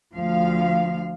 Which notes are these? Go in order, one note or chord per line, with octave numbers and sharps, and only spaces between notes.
D2 F3 F5